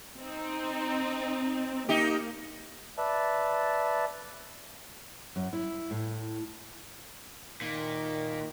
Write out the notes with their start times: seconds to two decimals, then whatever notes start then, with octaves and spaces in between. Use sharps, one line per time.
0.18 C4 D#4
1.89 A#3 D#4 G4
2.98 B4 D5 E5 A5
5.36 F#2
5.53 E4
5.91 A2
7.62 A#2 D#3